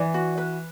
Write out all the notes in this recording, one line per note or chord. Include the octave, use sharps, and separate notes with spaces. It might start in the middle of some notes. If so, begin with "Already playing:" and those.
Already playing: E3 D5
F#4
B4